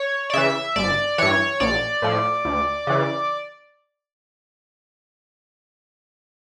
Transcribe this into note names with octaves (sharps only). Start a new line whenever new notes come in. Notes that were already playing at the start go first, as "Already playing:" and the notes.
Already playing: C#5
D5
C#3 E3 E5
G1 D5
G2 E3 C#5
A#1 D5
A2 F3
D2
C#3 E3